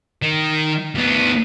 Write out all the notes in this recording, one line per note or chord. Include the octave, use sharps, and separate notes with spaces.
D#3
D2 B3